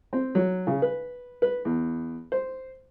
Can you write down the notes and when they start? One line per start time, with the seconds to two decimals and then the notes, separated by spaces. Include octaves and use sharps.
0.13 C4
0.35 F#3
0.67 C#3
0.82 B4
1.42 B4
1.65 E2
2.32 C5